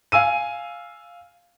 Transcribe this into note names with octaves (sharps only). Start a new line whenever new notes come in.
F5 G#5 E6 D#7